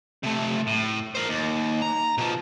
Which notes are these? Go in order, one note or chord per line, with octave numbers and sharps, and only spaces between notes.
C3 A3
A2
A#4 C5
D#2
A#5
B2 F3